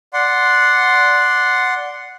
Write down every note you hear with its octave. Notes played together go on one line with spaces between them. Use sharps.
D5 F#5 C6